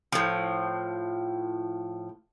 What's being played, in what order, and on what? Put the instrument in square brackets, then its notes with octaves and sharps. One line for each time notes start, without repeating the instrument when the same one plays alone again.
[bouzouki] A2 F3